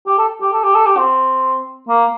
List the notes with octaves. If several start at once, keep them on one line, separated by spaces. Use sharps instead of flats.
G4
A4
G4
A4
G4
A4
G4
C4
A#3